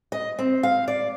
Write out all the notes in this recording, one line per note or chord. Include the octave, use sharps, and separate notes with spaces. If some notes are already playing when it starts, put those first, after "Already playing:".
D#5
C4
F5
D5